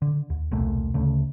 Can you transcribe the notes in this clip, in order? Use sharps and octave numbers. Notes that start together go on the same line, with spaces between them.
D3
D#2
E1 C2 A#2 A3
D2 C#3 A3